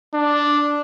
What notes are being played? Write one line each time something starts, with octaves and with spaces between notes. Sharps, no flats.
D4